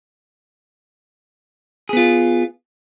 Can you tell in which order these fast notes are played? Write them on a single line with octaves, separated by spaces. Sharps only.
G#4 B3 F4